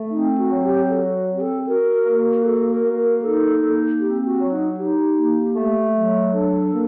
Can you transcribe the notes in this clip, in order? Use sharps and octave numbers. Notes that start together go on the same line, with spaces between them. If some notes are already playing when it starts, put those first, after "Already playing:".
Already playing: A3
C4 D#4
F#4
F#3
G4
F#4 A4
C4
G4
A4
F#4 A#4
A#3
F#4 A4
A#4
A#3
A#4
D#4 A4
A#3
C4 G4
F#4
F#3
D#4
D#4 G4
A#3
A3
F#3
D4 A4
A#3